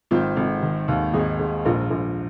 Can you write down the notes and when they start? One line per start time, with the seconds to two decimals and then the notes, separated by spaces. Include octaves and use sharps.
0.11 G#1 C4 F4
0.37 G#1
0.62 D#3
0.88 D#2
1.13 G#1 D#4 G#4
1.39 G#2
1.65 A#1 F4 A#4
1.91 A#1